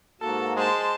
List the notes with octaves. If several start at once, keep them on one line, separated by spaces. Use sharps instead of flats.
G#2 A#3 F#4 A4 A5
G#3 C5 A5